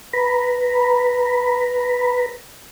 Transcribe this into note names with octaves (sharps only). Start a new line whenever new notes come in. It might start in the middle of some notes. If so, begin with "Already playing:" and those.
B4 A#5 B5